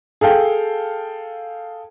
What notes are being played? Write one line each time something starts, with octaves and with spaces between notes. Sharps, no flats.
G#4 A4 F5 G5